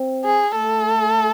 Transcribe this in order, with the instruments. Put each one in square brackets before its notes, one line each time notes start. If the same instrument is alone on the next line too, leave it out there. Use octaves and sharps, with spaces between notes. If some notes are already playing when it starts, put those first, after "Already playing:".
Already playing: [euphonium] C4
[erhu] G#4
[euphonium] A3 [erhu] A4